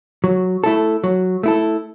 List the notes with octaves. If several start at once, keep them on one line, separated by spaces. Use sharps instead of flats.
F#3
A3 E4 A4
F#3
A3 E4 A4